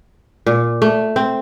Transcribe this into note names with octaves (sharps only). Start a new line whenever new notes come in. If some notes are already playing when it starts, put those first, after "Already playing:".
A#2
A3
C4